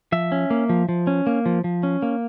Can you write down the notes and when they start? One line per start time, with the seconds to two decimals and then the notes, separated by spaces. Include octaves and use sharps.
0.12 F3 E5
0.32 C#4
0.50 A#3
0.69 F3
0.89 F3
1.07 C#4
1.27 A#3
1.46 F3
1.64 F3
1.83 C#4
2.02 A#3